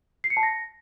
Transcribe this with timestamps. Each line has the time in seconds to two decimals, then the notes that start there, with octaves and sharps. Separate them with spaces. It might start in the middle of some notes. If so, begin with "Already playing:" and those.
0.24 C7
0.30 C#7
0.37 A5
0.43 A#6